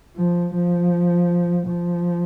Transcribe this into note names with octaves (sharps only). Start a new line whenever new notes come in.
F3
F3
F3